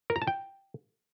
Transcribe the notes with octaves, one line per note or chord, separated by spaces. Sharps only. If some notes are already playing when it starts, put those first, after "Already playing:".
A#4
A#5
A5
G5